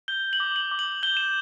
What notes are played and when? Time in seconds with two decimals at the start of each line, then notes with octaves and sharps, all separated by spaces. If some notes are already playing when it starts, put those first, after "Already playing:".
0.08 G6 G7
0.33 F#7
0.40 D6
0.56 F#7
0.71 D6
0.79 F#7
1.03 G6 G7
1.17 E7